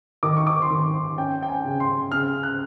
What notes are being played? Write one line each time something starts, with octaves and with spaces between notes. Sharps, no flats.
D#3 D6
C#6
D6
C6
D#3 C#6
C6
C#4 G5
G5
G#5
C#3
C6
C#3 F6
F#6